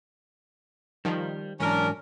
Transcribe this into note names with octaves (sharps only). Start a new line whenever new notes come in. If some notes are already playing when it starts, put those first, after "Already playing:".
D#3 F3 G3
G#2 E3 F#3 C#4 D4 A#4